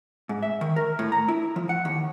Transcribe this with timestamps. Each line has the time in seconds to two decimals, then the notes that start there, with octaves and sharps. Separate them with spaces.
0.29 G#2
0.43 E5
0.61 D#3
0.76 A#4
0.99 A2
1.12 A#5
1.28 E4
1.56 F3
1.69 F#5
1.85 D#2